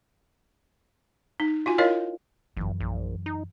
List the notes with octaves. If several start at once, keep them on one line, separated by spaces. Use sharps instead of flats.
D#4
F4 F#4 G#5
E4 F4 A#4 C#5 D#5 F5
G1 F#2 E3
A#1
D#4